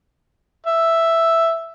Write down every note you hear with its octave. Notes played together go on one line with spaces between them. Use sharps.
E5